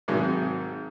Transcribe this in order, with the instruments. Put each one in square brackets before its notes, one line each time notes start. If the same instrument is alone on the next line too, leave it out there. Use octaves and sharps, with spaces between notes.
[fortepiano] G#1 G#2 C3 D#3 F#3